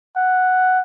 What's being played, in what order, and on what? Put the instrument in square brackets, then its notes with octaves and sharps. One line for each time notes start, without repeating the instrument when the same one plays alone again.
[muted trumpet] F#5